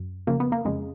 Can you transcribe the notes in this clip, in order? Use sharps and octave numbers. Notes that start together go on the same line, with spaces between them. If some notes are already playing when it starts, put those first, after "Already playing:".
Already playing: F#2
F2 C#3 A#3
B3
A#3
F2 C#3 G#3